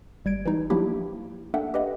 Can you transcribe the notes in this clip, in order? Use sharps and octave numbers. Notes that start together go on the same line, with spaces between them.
G1 G3 G#6 D7
E3 G3 D#4
F3 F#3 A#3 D4 E4 G4
A#3 D4 A4 E5 F#5 G5
G4 B4 D#5 F#5